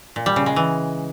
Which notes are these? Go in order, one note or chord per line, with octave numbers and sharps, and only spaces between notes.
A#2
G3
C#3
G#3
E3